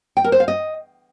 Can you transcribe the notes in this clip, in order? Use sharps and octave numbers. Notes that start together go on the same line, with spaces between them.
G5
A#4
C5
F5
D#5